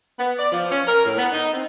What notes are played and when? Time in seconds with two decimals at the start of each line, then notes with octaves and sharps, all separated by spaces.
0.19 B3
0.39 D5
0.52 F3
0.71 C#4
0.87 A#4
1.05 A2
1.18 B3
1.32 D#4
1.54 C4